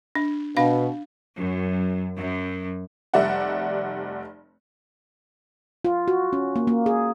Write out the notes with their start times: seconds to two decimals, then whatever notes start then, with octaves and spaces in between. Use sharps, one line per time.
0.15 D4
0.57 B2 D4 F5
1.36 F#2
2.17 F#2
3.14 F1 G3 D5 E5 F#5
5.85 F4
6.08 F#4
6.33 C#4
6.56 A#3
6.67 A#3
6.86 G#4